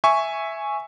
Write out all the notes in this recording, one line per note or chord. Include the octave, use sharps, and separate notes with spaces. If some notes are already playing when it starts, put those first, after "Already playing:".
E5 G#5 C#6